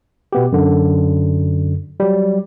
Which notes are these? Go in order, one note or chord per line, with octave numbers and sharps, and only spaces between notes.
B2 B3 G4
F#2 D3
F#3 G3